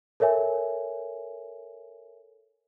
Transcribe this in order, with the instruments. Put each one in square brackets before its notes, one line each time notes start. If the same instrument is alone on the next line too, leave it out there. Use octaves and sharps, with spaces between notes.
[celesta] A4 A#4 C#5 E5 G#5